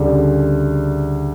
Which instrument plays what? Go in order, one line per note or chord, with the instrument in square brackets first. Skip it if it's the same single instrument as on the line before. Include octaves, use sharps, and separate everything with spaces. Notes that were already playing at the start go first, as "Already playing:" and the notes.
Already playing: [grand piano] D2 C#3 G3 D4